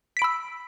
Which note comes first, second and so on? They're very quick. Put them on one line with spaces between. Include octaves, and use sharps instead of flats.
B6 D7 B5 E6